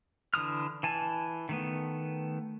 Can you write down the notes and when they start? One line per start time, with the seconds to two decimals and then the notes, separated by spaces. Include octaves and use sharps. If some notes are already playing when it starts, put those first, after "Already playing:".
0.34 D3 E3 D#6 F6
0.83 E3 G#5 A5
1.49 D#3 A3 B3